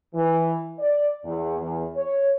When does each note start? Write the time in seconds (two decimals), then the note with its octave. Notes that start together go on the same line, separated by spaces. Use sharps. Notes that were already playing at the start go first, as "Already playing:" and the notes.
0.13 E3
0.78 D5
1.24 E2
1.59 E2
1.95 C#5